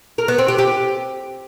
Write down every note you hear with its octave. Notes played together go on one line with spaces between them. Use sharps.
A#4
B3
C4
G4
G4